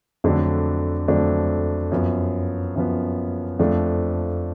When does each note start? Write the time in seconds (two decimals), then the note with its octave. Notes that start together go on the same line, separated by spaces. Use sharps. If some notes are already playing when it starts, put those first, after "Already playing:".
0.24 F2 D3 F#3 A3 D4
1.08 F2 D3 F#3 A3 D4
1.92 F#2 F3 B3
2.76 F#2 F3 B3
3.59 F2 F3 A3 D4